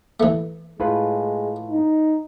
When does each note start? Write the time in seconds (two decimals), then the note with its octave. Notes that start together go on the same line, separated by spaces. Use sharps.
0.20 E3 A3
0.80 A2 G#3 F4 B4
1.70 D#4